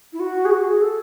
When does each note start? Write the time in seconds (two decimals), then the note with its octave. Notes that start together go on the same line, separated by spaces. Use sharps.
0.13 E4
0.20 F#4
0.45 G#4
0.51 F#4
0.66 G#4
0.81 A4